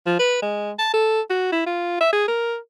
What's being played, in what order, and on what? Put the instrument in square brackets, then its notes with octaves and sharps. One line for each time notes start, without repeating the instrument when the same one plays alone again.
[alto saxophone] F3
B4
G#3
A5
A4
F#4
E4
F4
E5
G#4
A#4